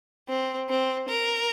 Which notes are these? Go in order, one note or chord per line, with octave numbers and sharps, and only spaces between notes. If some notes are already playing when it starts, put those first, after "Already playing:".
C4
C4
A#4